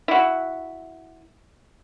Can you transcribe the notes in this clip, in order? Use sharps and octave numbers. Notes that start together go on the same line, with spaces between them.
E4 F#4